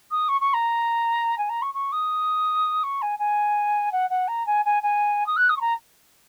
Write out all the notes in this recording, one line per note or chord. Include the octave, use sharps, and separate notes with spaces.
D#6
C#6
C#6
A#5
G#5
A#5
C#6
C#6
D#6
C#6
G#5
G#5
F#5
F#5
A#5
G#5
G#5
G#5
D#6
F#6
D#6
C#6
A#5